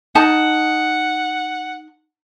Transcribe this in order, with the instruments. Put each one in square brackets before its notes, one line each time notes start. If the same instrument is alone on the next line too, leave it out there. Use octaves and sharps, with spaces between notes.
[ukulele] D#4 A5 [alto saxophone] F#5